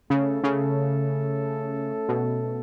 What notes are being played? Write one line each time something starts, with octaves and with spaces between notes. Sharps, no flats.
C#3 A3 C#4 A4
C#3
B2